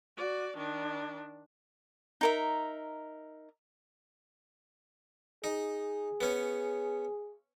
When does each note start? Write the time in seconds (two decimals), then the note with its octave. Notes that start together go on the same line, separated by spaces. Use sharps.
0.17 F#4 D5
0.57 D#3 D4
2.21 D#4 A#4 E5
5.44 D#4 G#4
6.21 B3 C#4